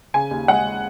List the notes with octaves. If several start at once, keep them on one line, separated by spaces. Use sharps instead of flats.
C#3 G#5
D#2
G#3 F#5